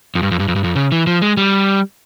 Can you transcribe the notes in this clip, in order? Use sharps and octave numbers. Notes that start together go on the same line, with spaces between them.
F2
G2
F2
G2
F2
G2
F2
C#3
E3
F3
G#3
G3